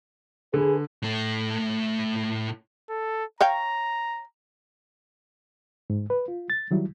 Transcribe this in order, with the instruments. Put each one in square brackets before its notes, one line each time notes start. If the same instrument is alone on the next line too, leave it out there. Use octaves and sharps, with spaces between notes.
[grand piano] D3 [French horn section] G#4 B4
[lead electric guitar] A2 A3
[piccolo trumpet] A4
[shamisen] C#5 F5 G5 [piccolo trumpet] A#5
[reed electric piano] G#2
B4
F4
A6
D#3 F#3 G3 E4